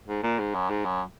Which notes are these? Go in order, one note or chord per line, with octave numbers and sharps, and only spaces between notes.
G#2
A#2
G#2
F#2
G#2
F#2